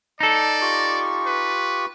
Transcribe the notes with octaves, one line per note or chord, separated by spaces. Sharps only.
D#4 A4 D5
F4 G4 C#6
B4